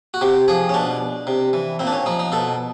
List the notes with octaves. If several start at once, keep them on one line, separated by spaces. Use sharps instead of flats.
F#4
C3 G4
F3 G#4
C#4
B2 D4
C3
E3
A#2 C4
D4
C#4
F3 D#4
D#4
B2 A4